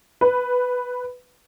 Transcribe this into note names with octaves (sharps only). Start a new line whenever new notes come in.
B4